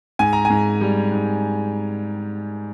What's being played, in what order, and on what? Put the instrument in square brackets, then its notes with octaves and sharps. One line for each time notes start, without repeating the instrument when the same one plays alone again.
[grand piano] G#2 G#5
A#5
G#5
G#2
G3
G#2